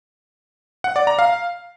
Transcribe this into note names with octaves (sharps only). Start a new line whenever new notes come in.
F#5
D5
A#5
F5